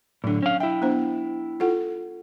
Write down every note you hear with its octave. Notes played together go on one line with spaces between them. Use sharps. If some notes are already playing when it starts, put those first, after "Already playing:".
A2 D3 F#3 D4
C#4 F5
E4 E5 G5
B3 D4 C5
F4 A4 F#5